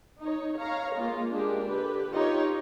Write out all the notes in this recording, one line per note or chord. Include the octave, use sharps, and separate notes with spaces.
D#4 C#5
C#5 F5 A#5
G#3 A#3 F4
G#3 D4 G4 A#4
D3 G4 B4
D#4 F4 G4 C#5 D#5